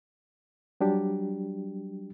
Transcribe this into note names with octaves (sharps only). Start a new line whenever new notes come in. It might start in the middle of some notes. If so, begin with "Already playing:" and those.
F#3 G3 D4 G4